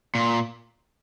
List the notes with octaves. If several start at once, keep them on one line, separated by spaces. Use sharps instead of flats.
A#2